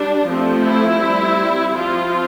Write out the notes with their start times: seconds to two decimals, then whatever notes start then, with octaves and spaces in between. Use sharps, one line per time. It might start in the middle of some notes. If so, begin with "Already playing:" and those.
Already playing: G3 D4
0.27 F3 A3 C4
0.64 E4
1.00 G3 C4
1.75 F3 C4 F4